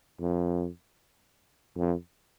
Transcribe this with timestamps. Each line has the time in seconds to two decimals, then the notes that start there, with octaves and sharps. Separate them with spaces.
0.21 F2
1.77 F2